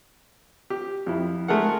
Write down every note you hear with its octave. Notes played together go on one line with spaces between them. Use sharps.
G4
F2 E4
G#3 A3 G#4 A#4 F#5